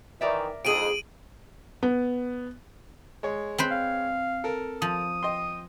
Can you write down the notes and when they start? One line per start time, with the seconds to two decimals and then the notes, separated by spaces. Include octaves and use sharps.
0.21 D#3 E3 A#4 D5 E5
0.65 F2 G#2 D4 G#4 D7 D#7 F#7
1.83 B3
3.23 G#3 C#5
3.58 C4 B4 C5
3.71 F5
4.44 A4 A#4
4.82 F3 D#6
5.23 D#5 G5 C6